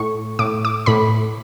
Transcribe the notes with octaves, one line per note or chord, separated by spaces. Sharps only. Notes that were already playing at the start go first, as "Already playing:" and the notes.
Already playing: A2 C#6
A2 D6
D6
A2 B5